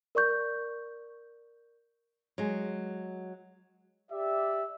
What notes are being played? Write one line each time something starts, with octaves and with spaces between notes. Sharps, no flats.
A#4 D5 C#6 G6
F#3 G#3
G4 D5 E5